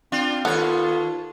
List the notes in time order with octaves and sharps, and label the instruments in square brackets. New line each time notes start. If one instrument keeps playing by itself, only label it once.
[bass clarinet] C4 [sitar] D4 F4
[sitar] D#2 C#5 [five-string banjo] B3 [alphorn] F4 [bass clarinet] A4